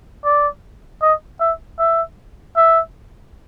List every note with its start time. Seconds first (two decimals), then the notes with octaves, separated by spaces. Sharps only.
0.25 D5
1.02 D#5
1.40 E5
1.79 E5
2.57 E5